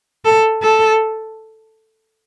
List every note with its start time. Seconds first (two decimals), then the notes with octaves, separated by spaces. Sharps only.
0.25 A4
0.62 A4